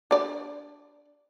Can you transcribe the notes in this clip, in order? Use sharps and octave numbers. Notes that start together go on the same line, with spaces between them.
D4 D5